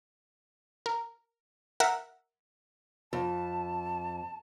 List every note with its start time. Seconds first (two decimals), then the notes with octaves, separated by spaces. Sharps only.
0.86 A#4
1.80 A#4 E5 F#5
3.13 F2 A5